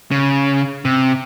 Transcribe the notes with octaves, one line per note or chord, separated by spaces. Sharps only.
C#3
C3